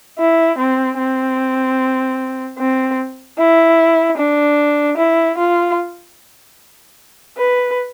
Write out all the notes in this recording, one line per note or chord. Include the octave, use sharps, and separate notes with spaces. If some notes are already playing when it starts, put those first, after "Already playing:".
E4
C4
C4
C4
E4
D4
E4
F4
B4